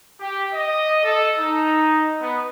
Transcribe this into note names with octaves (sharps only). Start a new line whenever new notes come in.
G4
D#5
A4
D#4
B3